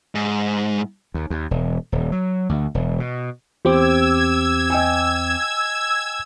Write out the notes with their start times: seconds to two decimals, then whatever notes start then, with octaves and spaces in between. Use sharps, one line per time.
0.15 G#2
1.14 D#2
1.30 D#2
1.51 E1
1.92 D#1
2.12 F#3
2.49 D2
2.75 E1
3.00 B2
3.65 E2 C4 G4 D6 E6 G#6
4.70 D#5 G5 G#5